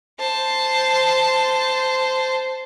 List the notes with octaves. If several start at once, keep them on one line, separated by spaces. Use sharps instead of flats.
C5 A5